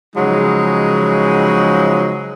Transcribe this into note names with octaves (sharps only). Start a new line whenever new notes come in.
C#3 F3 F#3 G#3 D#4